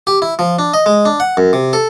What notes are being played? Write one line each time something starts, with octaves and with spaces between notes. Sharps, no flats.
G4
E4
F3
D4
D#5
G#3
D4
F#5
F#2
C3
A4